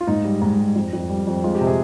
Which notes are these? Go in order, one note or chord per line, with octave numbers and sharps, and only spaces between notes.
F4
G#2 D#4
G3
G#2
G3
F2
F2
G3
F2
G#3 F4
G4
C3
G#4